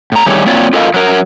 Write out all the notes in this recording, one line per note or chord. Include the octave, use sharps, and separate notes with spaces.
A2 A#5
D#3 G3 A3 G4 G#4 C#5
F#3 A#3 C4 F4 C#5 D5
F4 A4 A#4 D#5 F5
F#3 A#4